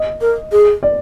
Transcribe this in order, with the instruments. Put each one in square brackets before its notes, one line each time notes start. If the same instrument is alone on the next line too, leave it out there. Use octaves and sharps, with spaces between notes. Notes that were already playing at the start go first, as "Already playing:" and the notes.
Already playing: [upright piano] D#5
[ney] A#4
G#4
[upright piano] D5